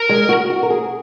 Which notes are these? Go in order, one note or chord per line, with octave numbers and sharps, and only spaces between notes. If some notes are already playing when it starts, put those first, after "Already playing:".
Already playing: A#4
G#3
F#4
F#4
A#4
G#4